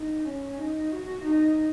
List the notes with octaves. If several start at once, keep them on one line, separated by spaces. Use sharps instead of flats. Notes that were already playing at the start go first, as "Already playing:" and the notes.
Already playing: D#4
C#4
D#4
F#4
D#4